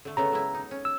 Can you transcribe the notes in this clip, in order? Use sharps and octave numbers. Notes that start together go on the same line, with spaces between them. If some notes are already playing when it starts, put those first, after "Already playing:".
D3 A3
C#3 A3 B3 A#5
F#3 G#3 E4
D#4
C#4
E6